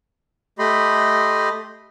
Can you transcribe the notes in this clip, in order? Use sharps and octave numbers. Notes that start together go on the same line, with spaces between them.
A3 G4 D#5 B5 C6